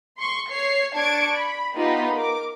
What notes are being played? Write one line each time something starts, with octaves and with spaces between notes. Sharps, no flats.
C6 C#6
C#5 C7
D4 A5 C#6 G#6 D7
B5
B3 D#4 F4 G4 B5
A#4 D6